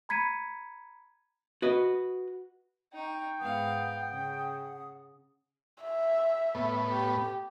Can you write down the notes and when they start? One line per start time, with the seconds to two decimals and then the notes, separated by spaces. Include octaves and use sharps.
0.09 A#5 B5 G#6 B6 C#7 D#7
1.62 F#4 B4 D#5
2.94 D#4 G5 C#6
3.39 G#2 B3 F5 F#5 D#6
4.08 C#3
5.84 E5
6.55 A2 B3
6.91 G4